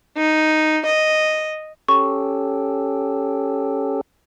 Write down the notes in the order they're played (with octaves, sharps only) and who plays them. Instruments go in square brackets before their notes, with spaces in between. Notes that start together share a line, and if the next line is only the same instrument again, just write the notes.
[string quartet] D#4
D#5
[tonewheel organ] C#4 G4 A4 [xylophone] C#6